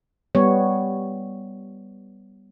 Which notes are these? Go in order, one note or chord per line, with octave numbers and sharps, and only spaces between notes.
G3 B3 C#5